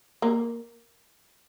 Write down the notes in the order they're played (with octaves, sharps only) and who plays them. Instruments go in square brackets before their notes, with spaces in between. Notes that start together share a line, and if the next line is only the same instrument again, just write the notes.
[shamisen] A#3